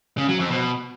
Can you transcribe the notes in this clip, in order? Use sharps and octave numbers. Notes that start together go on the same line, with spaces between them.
C#3
F#3
F2
B2